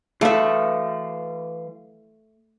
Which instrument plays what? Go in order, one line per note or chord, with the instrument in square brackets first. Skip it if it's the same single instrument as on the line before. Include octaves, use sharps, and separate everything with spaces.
[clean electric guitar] E3 F5 [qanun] A3 E5